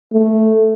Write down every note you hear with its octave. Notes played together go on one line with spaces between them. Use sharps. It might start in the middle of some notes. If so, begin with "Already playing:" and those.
A3